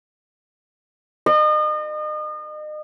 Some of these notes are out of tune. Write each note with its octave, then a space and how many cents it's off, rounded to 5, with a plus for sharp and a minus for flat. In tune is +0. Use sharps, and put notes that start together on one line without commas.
D#5 -35